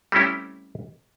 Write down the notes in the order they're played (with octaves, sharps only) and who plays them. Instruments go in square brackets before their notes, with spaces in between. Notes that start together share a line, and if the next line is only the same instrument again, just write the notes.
[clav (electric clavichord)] G3 A3 C4 C#4 E4 G4